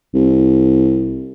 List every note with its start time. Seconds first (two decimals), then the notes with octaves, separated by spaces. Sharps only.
0.14 C2